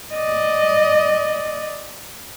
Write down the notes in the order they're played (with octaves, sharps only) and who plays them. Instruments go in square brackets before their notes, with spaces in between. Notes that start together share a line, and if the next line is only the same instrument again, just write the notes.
[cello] D5 D#5